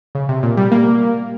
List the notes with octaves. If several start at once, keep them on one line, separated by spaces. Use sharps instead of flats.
C#3
C3
A#2
G3
A#3